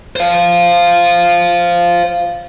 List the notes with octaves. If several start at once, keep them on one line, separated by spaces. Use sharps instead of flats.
C5 F5